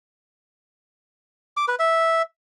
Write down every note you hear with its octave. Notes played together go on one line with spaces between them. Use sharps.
D6
B4
E5